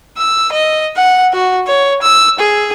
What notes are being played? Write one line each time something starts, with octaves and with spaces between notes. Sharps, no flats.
E6
D#5
F#5
F#4
C#5
E6
G#4